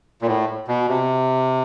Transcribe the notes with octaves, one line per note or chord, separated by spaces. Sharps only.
A#2
A2
B2
C3